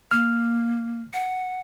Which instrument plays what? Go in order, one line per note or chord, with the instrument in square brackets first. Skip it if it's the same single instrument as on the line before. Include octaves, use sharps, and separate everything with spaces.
[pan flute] A#3 [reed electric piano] F6
[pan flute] F#5